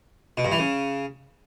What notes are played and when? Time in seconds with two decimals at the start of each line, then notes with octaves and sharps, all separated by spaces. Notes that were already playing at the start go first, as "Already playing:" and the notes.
0.38 B2
0.45 G2
0.52 E3
0.59 C#3